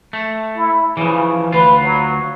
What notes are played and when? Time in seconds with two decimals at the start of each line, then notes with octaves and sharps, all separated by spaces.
0.13 A3
0.56 E4
0.97 C#3 E3 F3
1.52 D2 F4 B4
1.83 F#3